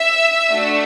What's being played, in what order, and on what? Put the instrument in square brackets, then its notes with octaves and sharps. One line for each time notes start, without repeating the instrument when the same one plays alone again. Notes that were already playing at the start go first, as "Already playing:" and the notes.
Already playing: [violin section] E5 E6
A3 D4 F#4 A4